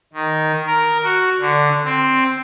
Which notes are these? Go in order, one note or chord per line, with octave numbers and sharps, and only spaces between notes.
D#3
A#4
F#4
D3
C4